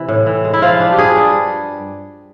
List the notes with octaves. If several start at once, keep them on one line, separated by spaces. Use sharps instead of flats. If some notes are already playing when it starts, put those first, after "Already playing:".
Already playing: C3 E3 E4
A2
E3
G#3
E4
F3 F4
D4
G4
G2 G#4
G3